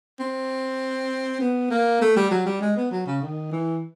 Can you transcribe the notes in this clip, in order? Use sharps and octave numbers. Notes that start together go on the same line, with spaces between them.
C4
B3
A#3
A3
G3
F#3
G3
G#3
B3
F#3
C#3
D#3
E3